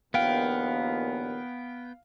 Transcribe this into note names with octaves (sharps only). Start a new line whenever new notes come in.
A#1 D#2 A#2 B3 F5 G5